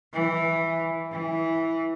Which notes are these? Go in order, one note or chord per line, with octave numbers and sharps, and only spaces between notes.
E3
E3